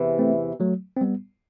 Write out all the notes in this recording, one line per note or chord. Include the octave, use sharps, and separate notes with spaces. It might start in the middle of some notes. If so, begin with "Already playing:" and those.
Already playing: E2 C3 E3
A3 C4
F#3 A3
C4
G3 B3